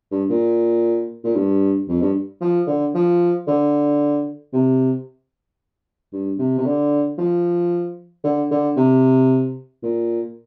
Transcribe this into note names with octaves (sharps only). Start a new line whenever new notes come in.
G2
A#2
A#2
G2
F2
G2
F3
D3
F3
D3
C3
G2
C3
C3
D3
F3
D3
D3
C3
A#2